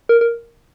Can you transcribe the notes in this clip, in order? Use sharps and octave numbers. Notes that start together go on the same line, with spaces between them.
A#4
A#4